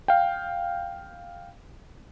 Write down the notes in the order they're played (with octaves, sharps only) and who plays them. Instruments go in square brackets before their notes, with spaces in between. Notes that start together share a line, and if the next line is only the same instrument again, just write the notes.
[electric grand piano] F5 G5